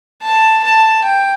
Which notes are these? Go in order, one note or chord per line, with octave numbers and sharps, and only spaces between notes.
A5
A5
G5